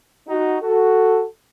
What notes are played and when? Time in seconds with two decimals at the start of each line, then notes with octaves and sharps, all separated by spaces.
0.28 D#4 F#4
0.62 F#4 A4